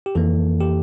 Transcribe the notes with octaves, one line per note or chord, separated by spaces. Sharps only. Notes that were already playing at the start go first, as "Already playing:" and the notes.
G4
F2 E3 A#3 A4
G4